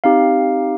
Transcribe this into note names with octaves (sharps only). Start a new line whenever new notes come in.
C4 D#4 G4 F5